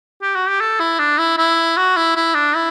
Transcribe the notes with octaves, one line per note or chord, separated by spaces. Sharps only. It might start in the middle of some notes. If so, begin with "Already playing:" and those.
G4
F#4
G4
A4
E4
D4
E4
E4
F#4
E4
E4
D4
E4